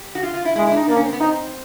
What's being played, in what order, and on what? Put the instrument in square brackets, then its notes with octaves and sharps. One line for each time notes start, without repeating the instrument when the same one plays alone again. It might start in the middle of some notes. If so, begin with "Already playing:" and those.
Already playing: [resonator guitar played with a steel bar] G4
F#4
F4
F4
E4
[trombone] G#3 [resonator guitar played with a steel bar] E4
[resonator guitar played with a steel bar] E4
D4
D#4
[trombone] A#3 [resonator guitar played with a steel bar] D4
[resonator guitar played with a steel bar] C#4
C4
B3
[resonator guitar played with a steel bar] C4 [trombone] D#4